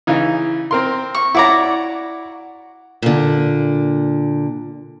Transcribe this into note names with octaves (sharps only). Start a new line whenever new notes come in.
C#3 E3 D#4
C4 A#4 C6
C#6
E4 F#4 C#5 D5 A#5
A#2 D3